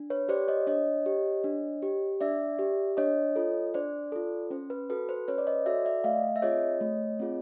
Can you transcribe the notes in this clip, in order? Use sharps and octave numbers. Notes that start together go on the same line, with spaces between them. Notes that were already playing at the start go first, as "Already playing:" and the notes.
Already playing: D4
B4 C#5
G4 C5 D5
C#5 D#5
D4 C#5 D#5
G4
D4
G4
D4 D5 E5
G4
D4 C#5 D#5
F4 A4
D4 C5 D5
F4 A4
C#4 C5
B4
F#4 A4 B4
C5
C#4 B4 C#5
D5
C#5 D#5
F#4 A4 D5 E5
D5 E5
A3 D#5 F5
E5
C4 F4 G#4 C#5 D#5
A3
C4 F4 G#4